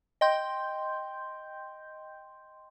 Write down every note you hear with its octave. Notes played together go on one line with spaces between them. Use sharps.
D#5 G5 C6 G6